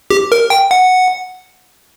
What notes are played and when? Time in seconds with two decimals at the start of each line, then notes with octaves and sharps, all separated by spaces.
0.11 G4
0.32 A#4
0.50 G5
0.71 F#5